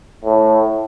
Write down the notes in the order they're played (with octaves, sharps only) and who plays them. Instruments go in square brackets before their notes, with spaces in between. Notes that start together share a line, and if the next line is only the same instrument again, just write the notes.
[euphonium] A2